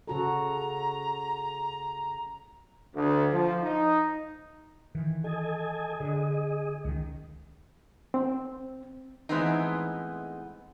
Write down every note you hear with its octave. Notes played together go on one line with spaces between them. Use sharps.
C#3 F#4 A4 A#5
D2
F3
D#4
D#3 E3
A4 D#5 G#5
D3 G#4 D#5
C#2 D#3
C4
A2 E3 G#3 B3 C4 D#4